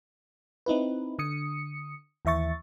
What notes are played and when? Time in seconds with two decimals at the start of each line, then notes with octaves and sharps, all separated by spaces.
0.66 C4 D#4 E4 B4
1.19 D3 D#6 C#7
2.25 D#2 E3 E5 C#6 A6